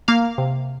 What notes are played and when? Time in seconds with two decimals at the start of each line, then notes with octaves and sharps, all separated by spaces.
0.08 A#3 F5
0.38 C3